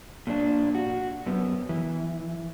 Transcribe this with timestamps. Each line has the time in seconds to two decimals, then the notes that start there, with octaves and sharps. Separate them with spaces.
0.27 A#2 D4
0.75 F#4
1.26 F#2 B3
1.69 E3